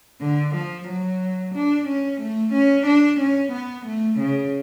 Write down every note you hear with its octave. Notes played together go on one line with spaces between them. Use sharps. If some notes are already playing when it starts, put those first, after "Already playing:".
D3
F3
F#3
D4
C#4
A3
C#4
D4
C#4
B3
A3
C#3